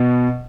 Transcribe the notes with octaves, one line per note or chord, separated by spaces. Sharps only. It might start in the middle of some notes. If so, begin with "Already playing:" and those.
Already playing: B2